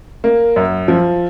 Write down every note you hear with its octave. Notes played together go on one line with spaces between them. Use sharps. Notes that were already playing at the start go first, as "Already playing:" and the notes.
A#3
F#2
F3